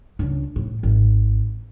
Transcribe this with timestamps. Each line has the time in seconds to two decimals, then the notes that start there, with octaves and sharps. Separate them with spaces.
0.19 C#2 D4
0.56 A2
0.83 G#1